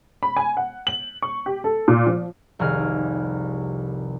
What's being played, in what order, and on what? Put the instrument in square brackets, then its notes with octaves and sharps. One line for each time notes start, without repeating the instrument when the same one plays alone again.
[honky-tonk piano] B5
G#5
F#5
F#7
C#6
G4
A4
A#2
F3
[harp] F1 C2 D#3 G#4 F6